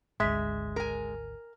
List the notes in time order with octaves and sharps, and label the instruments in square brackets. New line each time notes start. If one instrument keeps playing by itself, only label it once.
[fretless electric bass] G#1 D2 [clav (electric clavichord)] G#3 [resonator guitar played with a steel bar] E5
[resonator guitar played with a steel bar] A#4 G#5